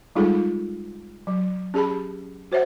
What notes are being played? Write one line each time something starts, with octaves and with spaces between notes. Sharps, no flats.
G3 G#3 D#4 F4 G#4 A4
F#3
C#4 G4 G#4 A5 B5
F#4 C5 C#5 E5 F#5